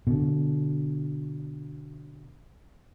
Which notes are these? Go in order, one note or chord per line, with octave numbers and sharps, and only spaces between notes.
B2 D3